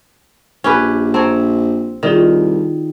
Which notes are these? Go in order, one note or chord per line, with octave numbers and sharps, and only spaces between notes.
A#1 C#4 G4 B4
C4 C#5 A5 A#5
C2 D#3 F4 G#4 D5